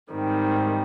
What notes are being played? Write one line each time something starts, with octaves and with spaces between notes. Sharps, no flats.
G#2 D#3 G3 C4